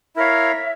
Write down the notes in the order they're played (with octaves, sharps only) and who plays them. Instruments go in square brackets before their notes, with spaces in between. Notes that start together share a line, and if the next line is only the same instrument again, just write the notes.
[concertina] E4 A#4 C#5 F5 [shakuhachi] E5